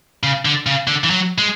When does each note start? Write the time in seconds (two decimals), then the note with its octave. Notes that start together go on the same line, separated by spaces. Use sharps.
0.23 C#3
0.45 D3
0.66 C#3
0.87 D3
1.04 E3
1.10 F#3
1.38 G#3